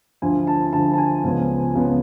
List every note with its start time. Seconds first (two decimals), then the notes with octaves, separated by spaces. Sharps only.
0.22 D2 D3 F3 G#5
0.47 A5
0.73 D2 D3 F3 A5
0.93 A5
0.98 G#5
1.24 C#2 C#3 F3 B3
1.75 C#2 C#3 F3 B3